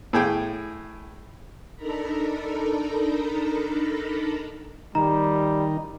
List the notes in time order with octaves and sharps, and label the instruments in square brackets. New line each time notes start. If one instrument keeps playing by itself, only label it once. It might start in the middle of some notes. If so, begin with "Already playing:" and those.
[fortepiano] A2 G#4 G5
[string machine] D4 D#4 A4 A#4 A#5 B5
[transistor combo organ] D#3 D#4 [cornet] G3 [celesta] A#5